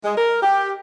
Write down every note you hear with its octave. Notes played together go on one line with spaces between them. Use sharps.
G#3
A#4
G4